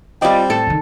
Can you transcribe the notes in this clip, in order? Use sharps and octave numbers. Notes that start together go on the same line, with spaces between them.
G3 C4 F4 D5 D#5
A2 A4
G2 D#3